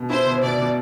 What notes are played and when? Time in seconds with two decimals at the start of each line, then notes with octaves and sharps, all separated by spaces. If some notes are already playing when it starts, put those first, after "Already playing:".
Already playing: B2
0.10 E4 C5
0.26 B2
0.42 B2 D5
0.58 B2